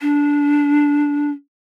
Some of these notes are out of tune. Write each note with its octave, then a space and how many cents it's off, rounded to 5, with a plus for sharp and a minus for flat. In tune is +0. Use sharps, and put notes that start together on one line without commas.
D4 -15